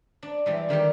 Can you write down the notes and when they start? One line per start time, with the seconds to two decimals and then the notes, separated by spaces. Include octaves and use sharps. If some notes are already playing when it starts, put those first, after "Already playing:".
0.23 D4
0.46 E3 G3 G#3
0.69 D3 D#3 G3 G4